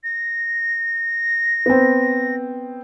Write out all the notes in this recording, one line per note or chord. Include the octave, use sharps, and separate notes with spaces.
A#6
B3 C4